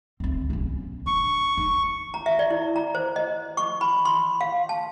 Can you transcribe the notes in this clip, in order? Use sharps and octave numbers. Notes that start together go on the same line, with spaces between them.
D2 C4
B1 C#4
D4 C#6
D#4
A#5
E5
D5
E4
A#5
C5
D#5
C#6
B5
C6
F5
A5